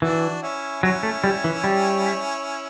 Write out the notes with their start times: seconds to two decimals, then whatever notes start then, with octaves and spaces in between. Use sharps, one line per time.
0.02 E3 D4 F#4
0.42 C#4 E4
0.83 F#3 C#4 E4
1.03 A3
1.24 G3
1.44 E3
1.64 G3